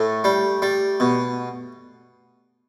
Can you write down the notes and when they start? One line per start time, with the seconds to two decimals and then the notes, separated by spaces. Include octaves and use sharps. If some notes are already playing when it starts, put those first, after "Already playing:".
Already playing: A2 A3
0.24 G3
0.62 G3
1.00 B2